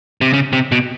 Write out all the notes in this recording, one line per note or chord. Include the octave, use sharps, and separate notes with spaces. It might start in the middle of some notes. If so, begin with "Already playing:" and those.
C3
C#3
C3
B2